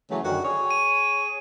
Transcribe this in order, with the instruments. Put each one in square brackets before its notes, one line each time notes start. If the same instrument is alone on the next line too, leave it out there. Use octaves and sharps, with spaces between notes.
[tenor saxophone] C#3 [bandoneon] E3 F#3 A3
[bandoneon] F#2 D3 D#3 [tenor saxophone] F#4
[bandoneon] G#4 [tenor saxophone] C#5
[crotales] D#7